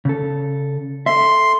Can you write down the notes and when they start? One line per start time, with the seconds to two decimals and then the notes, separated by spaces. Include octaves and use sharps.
0.05 C#3 A4
1.06 A4 E5 C6